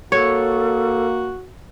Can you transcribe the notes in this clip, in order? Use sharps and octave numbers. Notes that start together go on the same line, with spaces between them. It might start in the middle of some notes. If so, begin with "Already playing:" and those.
A#3 F#4 A4 C#5